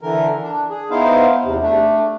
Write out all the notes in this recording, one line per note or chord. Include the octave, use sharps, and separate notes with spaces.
D3 E3 A#4
D4
G#4
B3 D#4 E4 C5 F5
E2 C3
A3 D4